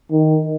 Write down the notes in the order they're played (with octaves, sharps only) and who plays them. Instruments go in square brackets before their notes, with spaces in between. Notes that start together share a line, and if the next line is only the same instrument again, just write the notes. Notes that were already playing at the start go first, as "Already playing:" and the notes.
[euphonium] D#3